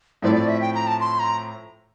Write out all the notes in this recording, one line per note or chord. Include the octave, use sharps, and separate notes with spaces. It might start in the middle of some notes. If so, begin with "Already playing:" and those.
A2 F3 A3 C4 E4 D5
D5
E5
G5
A#5
A5
C6
A#5